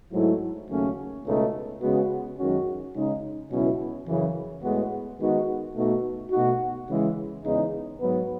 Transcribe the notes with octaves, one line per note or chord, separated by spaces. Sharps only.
G#2 F#3 A3 E4
D#2 C#3 F#3 A3 C#4
C#2 B2 A3 D#4
C#3 G#3 B3 F#4
F#2 D#3 G#3 C#4 F#4
C#3 G#3 D#4
C#2 B2 F#3 C#4 E4
F#2 C#3 E3
A2 G#3 B3 F#4
D#3 G#3 B3 D#4 F#4
B2 A3 D#4 F#4
B2 A3 D#4 F#4
C#3 E3 G#3
E2 C#3 G#3 D#4
G#2 F#3 B3